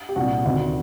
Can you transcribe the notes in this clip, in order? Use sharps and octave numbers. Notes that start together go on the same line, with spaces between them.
G4
C2 A#2 D4 F#4
D2 C3 D#3